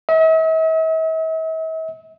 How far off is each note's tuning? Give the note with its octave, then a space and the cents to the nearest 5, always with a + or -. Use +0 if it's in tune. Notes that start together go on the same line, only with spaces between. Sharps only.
E5 -45